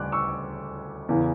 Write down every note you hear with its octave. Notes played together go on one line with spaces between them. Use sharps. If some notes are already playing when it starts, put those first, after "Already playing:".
Already playing: D2 C#3 G3 D6 F#6
C#6 E6
E2 C#3 E3